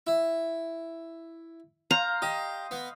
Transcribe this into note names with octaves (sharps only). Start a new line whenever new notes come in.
E4
C5 F5 A#5
G4 D#5
B3